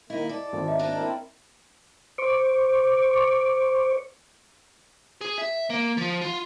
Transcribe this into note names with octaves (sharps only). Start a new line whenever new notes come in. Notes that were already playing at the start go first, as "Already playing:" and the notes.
D#3 A#3 D#4 E4 D#5
A4 D5
G#1
D#5 E5 A#5
A#3 D4 A4
C4 E4 A#4
C5 C#6 D6
G#4
E5
A#3
F3
F4